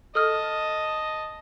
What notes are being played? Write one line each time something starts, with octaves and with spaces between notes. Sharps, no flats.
A4 D#5 A5 D#6 F6